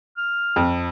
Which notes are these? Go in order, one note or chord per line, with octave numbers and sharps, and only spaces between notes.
F6
F2